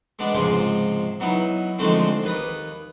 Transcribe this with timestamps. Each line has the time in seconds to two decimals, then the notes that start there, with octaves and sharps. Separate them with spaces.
0.19 G#3 B3 D4
0.34 C#2 G#2 C3 F3 G#3
1.20 F#3 B3 D#4 E4
1.78 D3 D#3 F3 G#3 A3 C4
2.23 D#2 B4 D#6